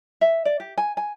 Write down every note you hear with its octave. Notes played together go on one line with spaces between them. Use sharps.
E5
D5
G4
G#5
G#5